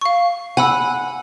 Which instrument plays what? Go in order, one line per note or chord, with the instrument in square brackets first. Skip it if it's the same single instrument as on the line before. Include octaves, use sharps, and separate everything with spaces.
[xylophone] F5 C#6
[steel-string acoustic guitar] F#5 [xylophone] G#5 B5 E6